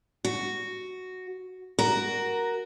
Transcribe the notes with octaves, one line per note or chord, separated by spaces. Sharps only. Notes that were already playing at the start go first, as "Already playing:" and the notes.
F#4
F#4 A#4